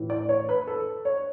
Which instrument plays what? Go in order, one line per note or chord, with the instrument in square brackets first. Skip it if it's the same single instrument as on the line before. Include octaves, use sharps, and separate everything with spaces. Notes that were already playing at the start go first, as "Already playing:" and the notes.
Already playing: [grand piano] A2 E3
D5
C#5
B4
A4
C#5